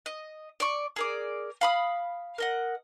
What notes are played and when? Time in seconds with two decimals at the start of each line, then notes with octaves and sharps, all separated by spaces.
0.06 D#5
0.60 D5 C#6
0.96 G#4 A#4 D5
1.61 F5 B5 D#6
2.38 A#4 D#5 F#5